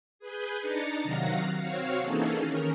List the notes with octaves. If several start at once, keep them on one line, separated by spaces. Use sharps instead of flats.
G#4 B4 G#5 G6
D4 D#4 A#5 A6 C#7
C3 D#3 F#3 F#4 F5 A#6
C4 F#4 C#5 F5
E3 A#3 C#4 D#4 G#4 A4
D#3 C#4 A#4